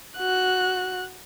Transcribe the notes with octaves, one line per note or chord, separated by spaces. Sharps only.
F#4 F#6